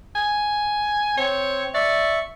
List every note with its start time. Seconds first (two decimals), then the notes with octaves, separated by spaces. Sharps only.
0.15 G#5
1.17 C4 C#5
1.74 D5 E5 C#6